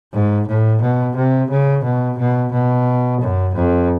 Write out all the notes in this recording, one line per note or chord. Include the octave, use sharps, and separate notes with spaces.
G#2
A2
B2
C3
C#3
B2
B2
B2
F#2
F2